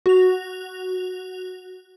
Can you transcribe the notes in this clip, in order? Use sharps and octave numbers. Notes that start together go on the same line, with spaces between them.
F#4 F7